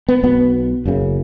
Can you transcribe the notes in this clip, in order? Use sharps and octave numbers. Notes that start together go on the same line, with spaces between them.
B3
B1 B2 B3
F#1 F#2 C#3